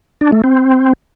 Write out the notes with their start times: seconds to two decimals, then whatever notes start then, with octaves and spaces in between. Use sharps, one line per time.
0.21 D4
0.32 A3
0.44 C4